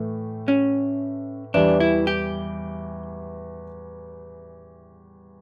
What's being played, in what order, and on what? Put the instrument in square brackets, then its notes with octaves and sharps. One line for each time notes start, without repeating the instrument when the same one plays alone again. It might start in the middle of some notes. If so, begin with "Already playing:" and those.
Already playing: [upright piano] A2 E3 A3
[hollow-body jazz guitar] C#4
[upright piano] E2 E3 G3 [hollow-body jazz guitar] D4
[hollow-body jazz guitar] E4
G4